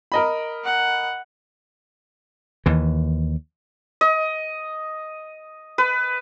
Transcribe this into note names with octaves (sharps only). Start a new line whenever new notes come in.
A#4 D#5 B5
F#5
D#2 E3
D#5
B4